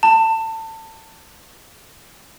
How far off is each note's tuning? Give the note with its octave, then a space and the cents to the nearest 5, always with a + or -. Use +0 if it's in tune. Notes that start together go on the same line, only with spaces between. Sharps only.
A5 +25